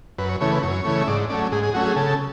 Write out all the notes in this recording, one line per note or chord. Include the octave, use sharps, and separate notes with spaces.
F#2 B4
C#5
C#3 E3 A3 C#5
B4
F#2 C#5
C#3 E3 A3
E5
G#2 D5
F#3 A3 C#4 D5
G#2 G#4
G#4
F#3 A3 C#4 F#4
G#4
C#3 A4